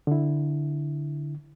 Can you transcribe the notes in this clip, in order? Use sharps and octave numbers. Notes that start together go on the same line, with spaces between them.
D3 E4